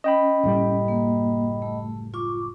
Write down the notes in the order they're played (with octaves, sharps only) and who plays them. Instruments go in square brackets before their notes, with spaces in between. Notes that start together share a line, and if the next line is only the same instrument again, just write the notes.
[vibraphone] C#4 [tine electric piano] D#5 G5 B5
[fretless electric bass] F#1 A2 G3
[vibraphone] A#3
A3
F4 C#6 D6